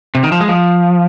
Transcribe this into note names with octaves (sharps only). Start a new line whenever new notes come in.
C3
D#3
F3
G#3
F3